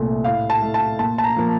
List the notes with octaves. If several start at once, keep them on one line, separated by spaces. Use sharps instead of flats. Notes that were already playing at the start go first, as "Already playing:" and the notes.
Already playing: C2 A#2 A3
A2 F5
A5
A3
A5
A#2 A5
A5
A#5
F3 A#3